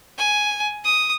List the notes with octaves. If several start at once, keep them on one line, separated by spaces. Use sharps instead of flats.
G#5
D#6